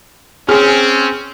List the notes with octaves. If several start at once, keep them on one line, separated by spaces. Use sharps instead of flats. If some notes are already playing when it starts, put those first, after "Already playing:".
C4 C#4 G#4 F6